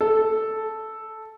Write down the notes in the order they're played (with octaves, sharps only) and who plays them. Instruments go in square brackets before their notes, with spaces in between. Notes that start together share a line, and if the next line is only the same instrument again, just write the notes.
[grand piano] A4